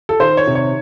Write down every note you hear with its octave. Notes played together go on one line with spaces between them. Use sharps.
A4
D#3 C5
C#5
C3
C#5